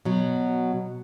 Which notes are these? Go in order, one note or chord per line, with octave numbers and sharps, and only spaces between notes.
B2 F#3